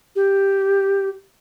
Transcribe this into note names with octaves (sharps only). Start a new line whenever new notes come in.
G4